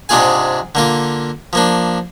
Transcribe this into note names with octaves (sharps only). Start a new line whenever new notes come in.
G#2 C3 D4 F4 G#4 G#5
D3 A#3 F4
F3 A#3 D4